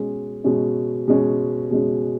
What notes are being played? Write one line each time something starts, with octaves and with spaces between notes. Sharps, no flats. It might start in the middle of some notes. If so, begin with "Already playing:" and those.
Already playing: B2 G#3 C#4
B2 G#3 C#4
B2 G#3 C#4
B2 G#3 C#4